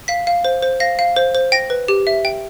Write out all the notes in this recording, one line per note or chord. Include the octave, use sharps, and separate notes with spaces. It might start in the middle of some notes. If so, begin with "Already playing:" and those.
F5 B6
F5
C5
C5
F5 A#6
F5
C5
C5
G5 A#6
B4
G4
E5
G5